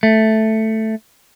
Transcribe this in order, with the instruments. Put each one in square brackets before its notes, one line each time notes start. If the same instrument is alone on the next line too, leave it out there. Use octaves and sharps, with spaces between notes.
[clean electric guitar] A3